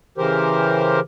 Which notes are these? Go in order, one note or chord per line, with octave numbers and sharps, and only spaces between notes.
C#3 E3 G4 A#4 C5